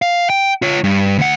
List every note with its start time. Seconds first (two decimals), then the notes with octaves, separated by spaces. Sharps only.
0.02 F5
0.30 G5
0.62 F4 C#5
0.84 G2
1.19 D2 F#5